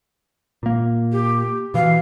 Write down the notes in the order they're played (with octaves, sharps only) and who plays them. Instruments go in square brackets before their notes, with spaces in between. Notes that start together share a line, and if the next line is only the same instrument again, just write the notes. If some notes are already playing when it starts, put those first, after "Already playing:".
[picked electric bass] A#2 A#3
[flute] G4
[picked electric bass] B2 E3 [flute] F5